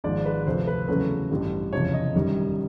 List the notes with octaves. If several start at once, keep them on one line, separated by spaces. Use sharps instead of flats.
G#1 G#2 F3 G#3 D5
B4
D2 C3 F3 A3 C5
B4
E2 C#3 F#3 A3 B4
A1 G2 D3 G3
F#1 E2 C3 F3 C#5
D#5
G1 F#2 D#3 G3